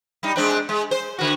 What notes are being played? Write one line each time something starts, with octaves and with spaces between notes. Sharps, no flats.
G3 D#4
G#3 C4 D4
G#3
C5
D3 F#4